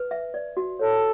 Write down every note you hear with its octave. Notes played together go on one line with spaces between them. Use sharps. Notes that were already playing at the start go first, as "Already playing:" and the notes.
Already playing: B4
E5
D5
F#4
A4 C#5